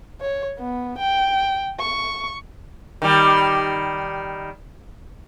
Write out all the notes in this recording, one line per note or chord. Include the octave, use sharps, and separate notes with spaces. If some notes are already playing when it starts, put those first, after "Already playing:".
C#5
B3
G5
C#6
D#3 G3